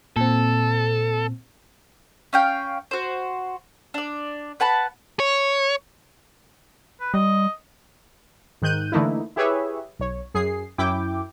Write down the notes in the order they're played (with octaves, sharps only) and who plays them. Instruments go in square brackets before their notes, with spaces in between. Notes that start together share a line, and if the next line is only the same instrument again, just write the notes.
[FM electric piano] A#2 C4 [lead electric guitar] A4
[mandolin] C#4 F5 G5
F#4 C5
D4 D5
B4 F#5 A5 B5
[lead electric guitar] C#5
[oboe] B4
[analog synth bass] G3 [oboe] D#5
[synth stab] G#2 D#3 F#6 G6 D#7
D3 E3 A3 A#3 D#4 E4
E4 G4 G#4 B4 C#5 E5
B1 C#5
F#2 G#4 C7
F#2 E4 G5 D6